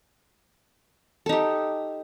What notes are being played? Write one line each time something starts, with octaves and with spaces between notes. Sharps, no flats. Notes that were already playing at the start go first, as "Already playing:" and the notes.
D#4 G4 A4